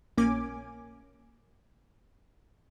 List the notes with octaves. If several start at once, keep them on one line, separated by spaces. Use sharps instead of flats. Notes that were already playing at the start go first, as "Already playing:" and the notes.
A#1 A#3 C#4 G#5 D6